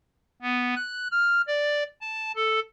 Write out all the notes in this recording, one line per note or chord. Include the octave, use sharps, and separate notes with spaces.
B3
F#6
F6
D5
A5
A4